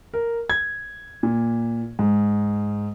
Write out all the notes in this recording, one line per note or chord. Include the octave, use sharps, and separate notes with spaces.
A#4
G#6
A#2
G#2